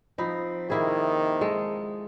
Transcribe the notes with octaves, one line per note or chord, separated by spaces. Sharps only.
F3 C4 D#4 B5
C3 D#3 A#3 E4 G#4
G#3 A4